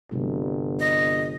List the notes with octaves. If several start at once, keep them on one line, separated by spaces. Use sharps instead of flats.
G1 C3 F#3 G#3
D#5